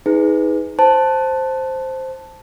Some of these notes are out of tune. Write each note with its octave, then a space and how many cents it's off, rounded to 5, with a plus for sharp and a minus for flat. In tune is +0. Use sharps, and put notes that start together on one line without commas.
D#4 +30 G#4 +0 B4 +15
C5 +0 A5 +0